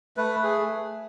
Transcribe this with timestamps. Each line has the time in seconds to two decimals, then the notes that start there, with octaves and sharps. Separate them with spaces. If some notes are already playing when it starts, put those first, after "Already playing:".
0.17 A3 B4
0.44 G#4